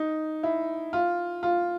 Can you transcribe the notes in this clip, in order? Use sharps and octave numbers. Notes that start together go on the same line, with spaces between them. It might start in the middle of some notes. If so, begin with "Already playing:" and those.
Already playing: D#4
E4
F4
F4